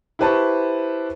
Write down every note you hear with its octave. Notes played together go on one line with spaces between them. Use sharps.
E4 G4 B4 C5 A5 C#6